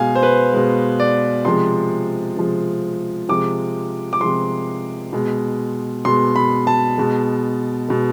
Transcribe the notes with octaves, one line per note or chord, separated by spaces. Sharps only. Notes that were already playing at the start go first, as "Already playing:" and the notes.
Already playing: B2 G#3 F5 G#5
C5
B4
B2 G#3
D5
C3 F3 G#3 C6
C3 F3 G#3
C3 F3 G#3 D6
D6
C3 F3 G#3 C6
B2 G#3
B2 G#3 C6
B5
A5
B2 G#3
B2 G#3